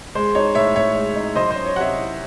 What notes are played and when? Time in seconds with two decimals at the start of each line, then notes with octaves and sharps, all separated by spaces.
0.15 G#3 C5
0.35 D#4 C#5
0.55 A2 C#5 E5
0.75 A2 C#5 E5
0.95 G#3
1.16 D#4
1.36 F#3 C5 D#5
1.51 C#4 C5
1.66 C#5
1.76 C3 C#5 E5 F#5
1.96 E4